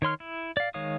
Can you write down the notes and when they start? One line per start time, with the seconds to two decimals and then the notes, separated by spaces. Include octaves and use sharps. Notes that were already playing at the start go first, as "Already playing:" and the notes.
0.02 D#3 C#5 C6 F6
0.20 E4
0.57 D5 F5
0.74 D#3 G#3 C#5 F5 D#6